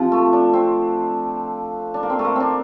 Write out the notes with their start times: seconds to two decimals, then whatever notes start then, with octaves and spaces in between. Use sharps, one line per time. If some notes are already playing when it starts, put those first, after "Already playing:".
Already playing: C3 F3
0.12 A3
0.33 D4
0.53 C4
1.94 D4
2.03 A#3
2.10 C4
2.19 A3
2.25 A#3
2.36 C4 D4